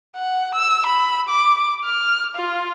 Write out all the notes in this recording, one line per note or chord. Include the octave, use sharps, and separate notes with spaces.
F#5
E6
B5
D6
F6
F4